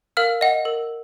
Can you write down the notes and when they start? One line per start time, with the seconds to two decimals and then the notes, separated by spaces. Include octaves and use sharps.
0.17 A#4 F5 F6
0.41 D#5 F#5
0.65 A#4